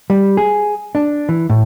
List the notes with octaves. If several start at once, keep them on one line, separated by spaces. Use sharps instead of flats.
G3
G#4
D4
E3
A2